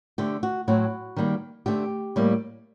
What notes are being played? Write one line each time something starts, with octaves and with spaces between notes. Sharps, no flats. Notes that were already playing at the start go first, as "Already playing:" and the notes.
D3 A3 C4 G4
F#4
A2 F#3 C4 F#4
D#3 G3 A#3
D3 A3 C4 G4
A2 G3 A#3